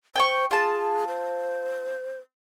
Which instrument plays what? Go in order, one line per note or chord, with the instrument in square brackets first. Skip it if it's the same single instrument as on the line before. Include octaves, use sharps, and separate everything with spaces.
[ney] C5 [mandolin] G5 G#5 C#6
[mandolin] F4 A5 [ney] G#4
[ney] C5